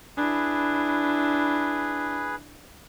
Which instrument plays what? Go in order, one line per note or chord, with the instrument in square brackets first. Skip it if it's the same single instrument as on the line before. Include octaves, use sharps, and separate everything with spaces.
[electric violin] D4 E4 [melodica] G#4 B4